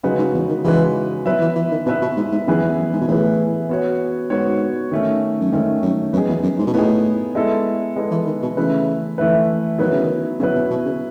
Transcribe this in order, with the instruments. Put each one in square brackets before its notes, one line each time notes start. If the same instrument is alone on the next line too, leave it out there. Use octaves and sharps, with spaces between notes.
[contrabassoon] F#2 [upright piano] C#3 G#3 D#4 F#4 B4
[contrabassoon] G#2
E2
D#3
[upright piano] C#3 G#3 D#4 F#4 B4 [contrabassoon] E3
[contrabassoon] F#3 [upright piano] B3 E4 B4 E5
[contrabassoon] E3
E3
D#3
[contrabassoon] B2 [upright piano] B3 E4 B4 E5
[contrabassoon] B2
G#2
G#2
[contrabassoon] F#2 [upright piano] E3 B3 E4 G#4 B4
[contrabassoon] E2
F#2
G#2
B2
[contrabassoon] A2 [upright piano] E3 B3 E4 G#4 B4
[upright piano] B3 F#4 C#5
[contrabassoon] G#2 [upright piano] B3 F#4 C#5
[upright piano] D#3 A3 C#4
[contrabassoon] F#2
[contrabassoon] G#2 [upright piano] D#3 A3 C#4
[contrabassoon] F#2
[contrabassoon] F#2 [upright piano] B3 D#4 G#4
[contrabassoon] E2
F#2
G#2
B2
[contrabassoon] A2 [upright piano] B3 D#4 G#4
[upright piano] G#3 B3 E4 A4
G#3 B3 E4 A4
[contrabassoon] E3
D#3
B2
[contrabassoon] C#3 [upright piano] E3 A3 E4 B4
[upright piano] E3 A3 E4 B4
[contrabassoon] D#3 [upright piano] F#3 B3 E4 B4
[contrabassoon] C#3
D#3
[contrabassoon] C#3 [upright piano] F#3 B3 E4 B4
[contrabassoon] B2
B2
C#3